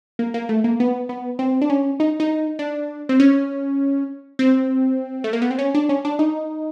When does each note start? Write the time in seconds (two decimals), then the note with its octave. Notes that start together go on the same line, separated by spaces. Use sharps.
0.19 A#3
0.34 A#3
0.49 A3
0.64 A#3
0.80 B3
1.09 B3
1.39 C4
1.62 D4
1.70 C#4
2.00 D#4
2.20 D#4
2.59 D4
3.09 C4
3.20 C#4
4.39 C4
5.24 A3
5.33 A#3
5.42 B3
5.51 C4
5.59 C#4
5.75 D4
5.89 C#4
6.05 D4
6.19 D#4